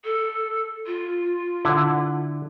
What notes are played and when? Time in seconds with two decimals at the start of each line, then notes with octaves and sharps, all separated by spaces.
0.05 A4
0.86 F4
1.65 D3 E4 F#5